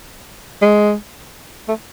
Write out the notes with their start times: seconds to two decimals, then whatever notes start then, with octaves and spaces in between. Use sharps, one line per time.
0.62 G#3
1.68 A3